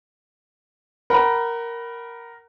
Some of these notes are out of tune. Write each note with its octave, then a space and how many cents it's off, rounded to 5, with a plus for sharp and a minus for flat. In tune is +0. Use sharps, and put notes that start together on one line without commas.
A#4 +0 F#5 +30 B5 -5